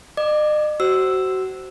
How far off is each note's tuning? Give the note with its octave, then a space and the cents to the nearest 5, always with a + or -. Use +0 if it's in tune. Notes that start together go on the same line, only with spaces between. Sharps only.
D#5 -45 D6 +5
F#4 +30 C5 +0 E6 +0